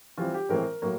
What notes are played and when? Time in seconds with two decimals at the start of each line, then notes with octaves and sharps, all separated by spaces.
0.17 E3 G3 C4 F4
0.34 G4
0.49 A2 E3 G#3 C4 A#4
0.82 A2 F#3 A#3